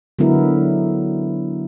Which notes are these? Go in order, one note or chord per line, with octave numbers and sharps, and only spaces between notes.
D3 F#3 G#3 B3 E4 A#4